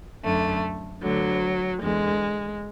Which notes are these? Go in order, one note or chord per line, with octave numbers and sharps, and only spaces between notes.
F#2 D3 A3
D2 D3 F#3
E2 D3 G#3